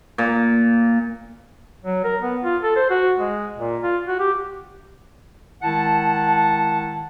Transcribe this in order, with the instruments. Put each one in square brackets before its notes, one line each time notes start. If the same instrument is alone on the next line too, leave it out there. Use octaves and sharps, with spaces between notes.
[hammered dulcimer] A#2
[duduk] F#3
A#4
B3
F4
A4
C5
F#4
G#3
A#2
F4
F#4
G4
[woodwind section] D#3 G#3 E4 F#5 A5